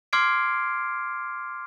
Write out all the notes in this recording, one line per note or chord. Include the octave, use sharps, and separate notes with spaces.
C6 D6 F6 G#6 C7 D7